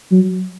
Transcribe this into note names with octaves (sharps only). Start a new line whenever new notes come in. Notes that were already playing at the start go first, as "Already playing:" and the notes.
F#3